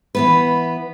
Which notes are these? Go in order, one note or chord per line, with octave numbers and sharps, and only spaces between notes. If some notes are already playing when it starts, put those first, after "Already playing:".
E3 B3 B4